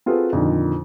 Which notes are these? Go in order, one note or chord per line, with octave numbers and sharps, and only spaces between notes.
C4 F4 F#4 G#4 A4 B4
F2 A#2 D3 D#3